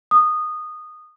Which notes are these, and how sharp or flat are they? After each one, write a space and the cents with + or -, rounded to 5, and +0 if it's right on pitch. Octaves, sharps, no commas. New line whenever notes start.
D#6 -15